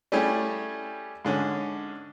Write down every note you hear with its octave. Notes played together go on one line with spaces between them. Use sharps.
G3 A3 C#4 E4 G4 G#4
G#2 D3 C#4